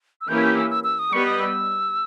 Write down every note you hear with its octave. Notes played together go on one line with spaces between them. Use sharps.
E6
E3 A#3 C#4 E4 G4 G6
G#6
G6
E6
E6
E6
D#6
G3 B3 G4 B4 D#5 C#6
D#6
E6